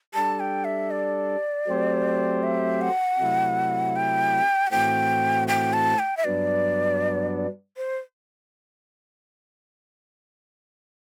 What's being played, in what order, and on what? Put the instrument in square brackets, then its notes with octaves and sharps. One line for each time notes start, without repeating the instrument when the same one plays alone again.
[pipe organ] G3 D4 A4 [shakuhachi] A5
[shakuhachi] G5
E5
D5
[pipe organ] F#3 A3 C4 G4 C5
[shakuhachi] E5
F#5
[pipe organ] C3 F#3 A3 E4
[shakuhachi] G5
F#5
[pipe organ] A2 E3 A3 C4 F#4 [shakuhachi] G5
[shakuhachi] G5
A5
G5
E5
[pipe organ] G2 F#3 B3 D4 [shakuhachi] D5
[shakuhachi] C5